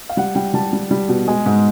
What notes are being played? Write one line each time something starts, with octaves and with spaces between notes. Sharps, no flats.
F5
G3 F#5
G3 G5
G3 A5
G3
G3
B2
G#3 G#5
G#2